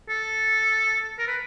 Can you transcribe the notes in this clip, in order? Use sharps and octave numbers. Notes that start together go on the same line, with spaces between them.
A4
A#4
B4